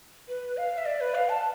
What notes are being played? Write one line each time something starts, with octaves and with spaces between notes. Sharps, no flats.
B4
F5
E5
D5
B4
F5
A5